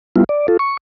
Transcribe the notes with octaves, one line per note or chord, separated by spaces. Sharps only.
G3 B3 E4 F4
D5
F4 A4
C#6